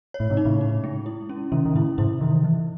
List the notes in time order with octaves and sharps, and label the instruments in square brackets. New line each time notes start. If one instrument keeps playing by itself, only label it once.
[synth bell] C#5
[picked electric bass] A2
G#2 C3
[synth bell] D#4
[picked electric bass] A2 C#3
[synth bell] D#4
G#3
E4
C#4
[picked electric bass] C3 D#3 [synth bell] C#4
[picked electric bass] D#3
[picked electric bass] A2 C#3 [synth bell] E4
[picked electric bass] G#2 C3 [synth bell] E4
[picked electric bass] C3 D#3 [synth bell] E3
[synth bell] E3